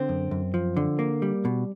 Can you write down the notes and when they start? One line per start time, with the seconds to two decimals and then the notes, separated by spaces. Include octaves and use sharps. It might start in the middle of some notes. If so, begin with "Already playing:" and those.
Already playing: D3 C4
0.09 F#2
0.31 F#2
0.54 F3
0.77 D3
0.99 A#3
1.22 G3
1.45 B2